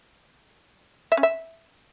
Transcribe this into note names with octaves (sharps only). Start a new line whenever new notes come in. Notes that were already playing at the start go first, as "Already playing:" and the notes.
E5
C#4
E5